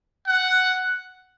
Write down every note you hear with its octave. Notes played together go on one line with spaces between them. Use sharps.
F#5